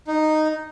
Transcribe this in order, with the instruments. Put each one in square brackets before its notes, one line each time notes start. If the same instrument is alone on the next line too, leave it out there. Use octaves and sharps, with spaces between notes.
[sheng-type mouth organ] D#4